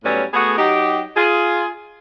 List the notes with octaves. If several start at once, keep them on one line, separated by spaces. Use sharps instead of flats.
A2 F#3 G3 B3 C#4
A3 B3 F#4 G#4
F#3 D#4 G4
F4 G#4